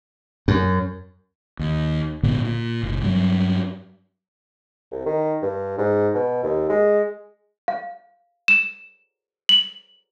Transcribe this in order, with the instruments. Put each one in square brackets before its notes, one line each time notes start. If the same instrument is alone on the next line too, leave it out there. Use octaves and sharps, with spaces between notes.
[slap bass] F#2
[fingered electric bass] D#2
G#1 A#2 D3 B3
A#2
F#1 A#2
G2 A#2 F#3
[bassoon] C2
D#3
G2
G#2
B2
D#2
G#3
[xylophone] F5
E7
F#7